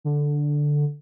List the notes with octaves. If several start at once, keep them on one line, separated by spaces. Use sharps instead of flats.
D3